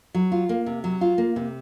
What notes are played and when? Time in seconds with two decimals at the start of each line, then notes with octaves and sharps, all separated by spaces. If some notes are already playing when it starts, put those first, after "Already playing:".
0.14 F#3
0.32 F4
0.49 A#3
0.66 C3
0.84 F#3
1.01 F4
1.18 A#3
1.36 C3